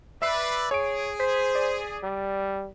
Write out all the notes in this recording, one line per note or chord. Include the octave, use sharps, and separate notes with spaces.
B4 D5 E5 E6 C7
G#4 C#5 D7
C5 B6
D5
G3